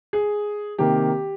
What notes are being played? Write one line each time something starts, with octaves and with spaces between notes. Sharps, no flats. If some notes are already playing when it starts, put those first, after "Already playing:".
G#4
C3 D#3 A#3 G4